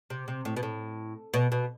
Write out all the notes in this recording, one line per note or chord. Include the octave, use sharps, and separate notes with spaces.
C3
C3
A2
B2
A2
B2
B2